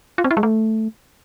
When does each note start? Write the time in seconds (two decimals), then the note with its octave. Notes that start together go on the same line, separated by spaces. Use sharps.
0.18 F4
0.24 C4
0.31 E4
0.37 G#3
0.43 A3